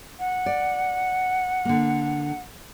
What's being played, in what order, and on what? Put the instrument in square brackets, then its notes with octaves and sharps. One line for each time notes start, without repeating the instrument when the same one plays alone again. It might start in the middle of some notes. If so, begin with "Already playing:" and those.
[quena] F#5
[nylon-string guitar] D5
D3 A#3